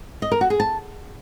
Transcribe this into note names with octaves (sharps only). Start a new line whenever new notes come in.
D#5
A#4
F#4
G#4
A5